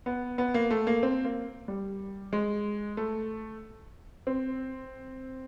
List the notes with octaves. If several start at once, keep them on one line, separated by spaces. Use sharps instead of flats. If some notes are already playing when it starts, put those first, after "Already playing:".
B3
B3
A#3
A3
A#3
C4
A#3
G3
G#3
A3
C4